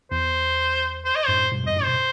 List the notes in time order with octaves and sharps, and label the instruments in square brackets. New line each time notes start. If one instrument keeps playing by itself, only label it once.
[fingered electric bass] E2 [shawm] C5
[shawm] C5
D#5
[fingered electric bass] F#2 A2 [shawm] C5
[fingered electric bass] G2 B2
[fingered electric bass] E2 G2 [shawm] D#5
[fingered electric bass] F#2 A2
[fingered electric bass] B2 [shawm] C5